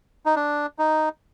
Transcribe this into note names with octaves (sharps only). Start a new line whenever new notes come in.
D#4
D4
D#4